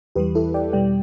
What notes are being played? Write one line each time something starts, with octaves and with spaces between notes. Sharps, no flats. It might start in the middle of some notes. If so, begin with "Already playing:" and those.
E2 E3 G3 G4 B4
E4 A4
D5 G5
E2 B2 G3 D5 G5